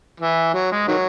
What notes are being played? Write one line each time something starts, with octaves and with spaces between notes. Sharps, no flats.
E3
F#3
G#3
D#3 F#3